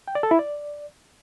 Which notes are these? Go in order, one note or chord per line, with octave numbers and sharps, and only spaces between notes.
G5
D5
A4
E4
D5